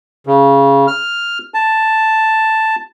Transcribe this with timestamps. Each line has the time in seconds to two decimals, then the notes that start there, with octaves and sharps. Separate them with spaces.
0.27 C#3
0.87 F6
1.54 A5